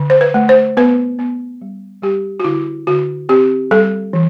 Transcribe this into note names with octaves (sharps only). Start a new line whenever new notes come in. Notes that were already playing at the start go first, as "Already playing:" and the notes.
Already playing: D3
C5
B4
A3
C5
B3 B4
B3
G3
G3 G4
F#4
D3 E4
D3 F#4
C4 G4
G3 A4
E3